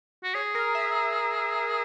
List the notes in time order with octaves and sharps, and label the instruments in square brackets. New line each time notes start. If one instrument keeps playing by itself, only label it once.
[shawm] F#4
[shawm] G#4 [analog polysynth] C#5
[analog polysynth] A#4
E5